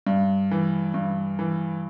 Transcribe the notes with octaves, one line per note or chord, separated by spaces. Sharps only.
G2
E3
G2
E3